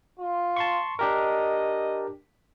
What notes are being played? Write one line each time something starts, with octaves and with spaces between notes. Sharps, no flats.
F4
A5 C6 C#6
D4 G4 A#4 D#5